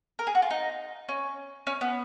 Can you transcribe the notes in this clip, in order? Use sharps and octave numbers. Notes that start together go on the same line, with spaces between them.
A#4
G#4
F#4
F4
D#4
C#4
C#4
B3